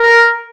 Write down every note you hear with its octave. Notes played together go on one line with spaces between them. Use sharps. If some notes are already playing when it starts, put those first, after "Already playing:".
Already playing: A#4